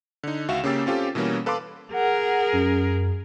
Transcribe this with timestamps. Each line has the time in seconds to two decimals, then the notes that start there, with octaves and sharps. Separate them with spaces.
0.23 D3 D#4
0.48 C#2 F#4 E5 F5 E7
0.64 C#3 A#3 C#4 G4 E6 A6
0.86 C4 C#4 F4 G4 A4
1.15 B2 E3 G3 A#3 C#4
1.46 A4 B4 F5 A5 C6 D6
1.93 G#4 A#4 F#5
2.53 F#2